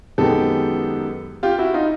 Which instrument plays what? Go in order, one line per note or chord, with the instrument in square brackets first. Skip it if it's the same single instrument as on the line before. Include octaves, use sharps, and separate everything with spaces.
[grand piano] F#2 D#3 G#3 B3 G4 A4
F4 G4
E4 F#4
D#4 F4